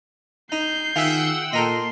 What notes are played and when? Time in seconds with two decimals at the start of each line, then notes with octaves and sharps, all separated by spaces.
0.52 D#4 G6 C7
0.96 D#3 F4 G#4 E5 F#5 G5 E6
1.53 A#2 A4 A#4 D#5 C6